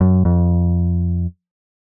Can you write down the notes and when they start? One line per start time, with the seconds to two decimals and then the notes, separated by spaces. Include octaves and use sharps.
0.01 F#2
0.25 F2